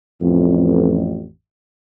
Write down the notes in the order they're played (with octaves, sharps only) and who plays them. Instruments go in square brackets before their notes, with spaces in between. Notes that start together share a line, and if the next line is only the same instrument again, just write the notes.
[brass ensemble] A1 F2